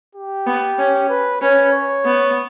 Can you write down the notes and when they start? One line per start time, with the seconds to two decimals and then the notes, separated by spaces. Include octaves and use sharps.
0.15 G4
0.46 B3
0.79 C#4
1.09 B4
1.41 C#4 B4
1.73 C#5
2.05 B3